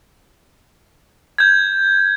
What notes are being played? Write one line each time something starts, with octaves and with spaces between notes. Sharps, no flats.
G6 G#6